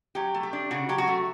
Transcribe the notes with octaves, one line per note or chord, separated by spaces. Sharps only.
F#3 G4
A3
G4
D4
C#3 F#4
F#3 G4
F#4
A3